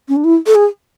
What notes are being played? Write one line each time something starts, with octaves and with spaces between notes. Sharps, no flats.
C#4
D4
E4
A4
G#4